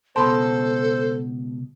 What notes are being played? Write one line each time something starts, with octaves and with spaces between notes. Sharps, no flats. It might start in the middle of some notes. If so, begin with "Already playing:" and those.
C#2 B2 A4 C5 A5 B5 C6